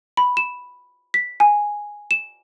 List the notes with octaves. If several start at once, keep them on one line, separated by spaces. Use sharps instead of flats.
B5
E7
B6
G#5
E7